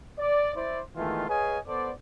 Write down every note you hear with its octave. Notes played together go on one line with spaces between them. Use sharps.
D5
E4 C5 D5
D#3 E3 G#3 A3 B3 F4
G#4 B4 C#5 D#5 F5 G#5
B3 A4 C5 D5